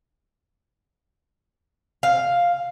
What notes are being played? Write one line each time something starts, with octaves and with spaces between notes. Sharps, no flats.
F5